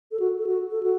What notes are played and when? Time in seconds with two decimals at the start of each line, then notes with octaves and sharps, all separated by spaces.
0.12 A4
0.20 F#4
0.39 A4
0.47 F#4
0.71 A4
0.83 F#4